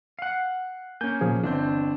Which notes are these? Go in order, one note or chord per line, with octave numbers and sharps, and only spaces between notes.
F5 F#5
A#3 C#4 G#5 G6
A#2 F3 G#4
G1 E3 C4 D4 G6